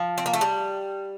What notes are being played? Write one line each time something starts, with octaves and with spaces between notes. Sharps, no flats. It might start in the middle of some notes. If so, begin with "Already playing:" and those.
Already playing: F3
C4
A#3
A3
G3